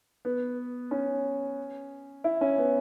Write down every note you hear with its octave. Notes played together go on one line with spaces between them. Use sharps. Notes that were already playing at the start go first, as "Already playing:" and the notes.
B3
C#4
E4
C#4
B3